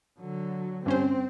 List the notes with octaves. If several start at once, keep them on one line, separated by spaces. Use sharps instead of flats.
D3 F#3
G2 C4 C#4 C5